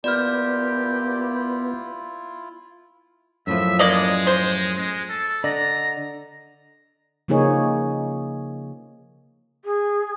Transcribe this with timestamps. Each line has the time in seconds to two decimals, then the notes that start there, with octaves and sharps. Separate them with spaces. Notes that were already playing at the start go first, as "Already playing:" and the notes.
0.04 A#2 B3 E4 F4 G4 D5 F6
3.47 F#2 A2 F3 E5
3.79 G#3 A#3 D5 D#5
4.27 C5
4.78 G#3
5.10 A4
5.44 D3 D5 D#5 A#5
7.28 C#3 F3 A#3 D#4 G#4 C#5
9.65 G#4